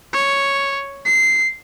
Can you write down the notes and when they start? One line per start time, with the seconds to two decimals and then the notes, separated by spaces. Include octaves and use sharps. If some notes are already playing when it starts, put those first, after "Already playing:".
0.13 C#5
1.05 C7